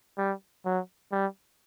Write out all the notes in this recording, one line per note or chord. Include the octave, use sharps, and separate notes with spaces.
G3
F#3
G3